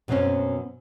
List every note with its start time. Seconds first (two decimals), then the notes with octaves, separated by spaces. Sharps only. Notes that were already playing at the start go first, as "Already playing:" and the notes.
0.08 F#2 B2 F#3 C4 C#4